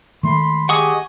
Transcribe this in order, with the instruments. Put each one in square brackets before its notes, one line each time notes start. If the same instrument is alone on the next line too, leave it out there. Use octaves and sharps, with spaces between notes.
[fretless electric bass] D#3 G#3 A3 [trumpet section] B5 C6
[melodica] G4 G#4 D#5 [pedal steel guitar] F#5 C#6 D#6 [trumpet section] G#5